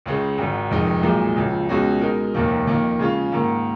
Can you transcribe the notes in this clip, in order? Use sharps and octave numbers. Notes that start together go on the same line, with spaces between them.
C#2 C#3 G#3 C#4
G#1 G#2 D#3
F1 F2 D#3 G#3 D#4
B1 A#2 G#3 D#4
C#2 C#3 F3
C#2 B2 G#3 C#4 F#4
B2 G#3 D#4 A#4
F1 D#2 D#3 A#3
F2 D#3 A#3
C#3 G#3 C#4 F4
G#2 D#3 A#3